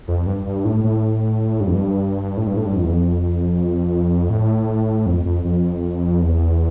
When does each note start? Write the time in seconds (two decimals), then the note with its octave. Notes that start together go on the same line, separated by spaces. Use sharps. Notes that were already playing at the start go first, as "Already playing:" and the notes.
0.08 F2
0.26 G2
0.46 G2
0.65 A2
0.84 A2
1.60 G2
1.67 F2
1.75 G2
2.37 A2
2.47 G2
2.57 A2
2.66 G2
2.76 F2
2.83 E2
2.92 F2
4.30 A2
5.06 F2
5.25 F2
5.45 F2
6.22 E2